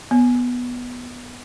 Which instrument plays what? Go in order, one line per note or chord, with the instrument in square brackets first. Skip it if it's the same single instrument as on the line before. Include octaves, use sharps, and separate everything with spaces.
[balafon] B3